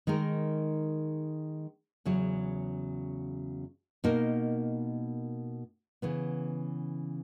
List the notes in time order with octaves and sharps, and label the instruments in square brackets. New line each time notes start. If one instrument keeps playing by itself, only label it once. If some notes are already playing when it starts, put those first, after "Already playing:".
[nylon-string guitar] D#3 G#3 D#4 A#4
E2 C#3 F#3
B2 A#3 D#4 A#4
C#3 E3 B3